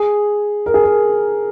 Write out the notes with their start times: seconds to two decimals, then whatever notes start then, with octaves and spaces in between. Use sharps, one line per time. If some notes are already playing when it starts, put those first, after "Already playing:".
Already playing: G#4
0.66 A#4
0.74 G#4
0.84 A#4